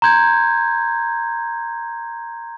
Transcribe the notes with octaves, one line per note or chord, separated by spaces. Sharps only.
A#5 C6 G6 G#6